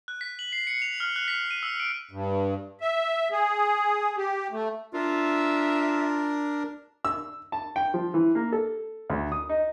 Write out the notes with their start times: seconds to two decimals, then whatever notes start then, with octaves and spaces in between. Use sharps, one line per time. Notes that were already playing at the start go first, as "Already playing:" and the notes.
0.08 F#6
0.21 B6
0.39 F#7
0.52 C7
0.67 C#7
0.82 F7
1.00 F6
1.16 F#6
1.28 B6
1.51 D#7
1.63 E6
1.80 D7
2.11 G2
2.81 E5
3.32 G#4
4.17 G4
4.52 A3
4.94 D4 F4 A#4 E5
7.05 E6
7.52 A5
7.76 G5
7.94 F3
8.14 E3
8.35 A#3
8.52 A4
9.10 D2
9.32 D#6
9.49 D#4